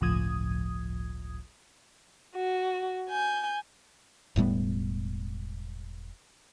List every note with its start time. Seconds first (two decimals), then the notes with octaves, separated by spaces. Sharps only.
0.01 G1 C#2 A2 F3 D#6 G#6
2.35 F#4
3.09 G#5 G6
4.36 E1 A2 G3 B3